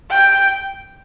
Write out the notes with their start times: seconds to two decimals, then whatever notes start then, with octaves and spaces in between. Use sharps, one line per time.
0.10 G5